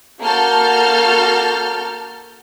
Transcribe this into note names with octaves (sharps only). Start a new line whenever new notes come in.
A#3 F#4 A4 A5 F6 G6